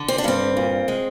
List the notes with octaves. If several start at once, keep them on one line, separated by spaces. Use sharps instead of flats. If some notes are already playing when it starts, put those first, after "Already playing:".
Already playing: D3
C4
D4
G2 C4
A#2
G#3